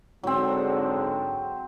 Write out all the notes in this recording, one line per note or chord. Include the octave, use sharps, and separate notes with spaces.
G#2 D3 F#3 C4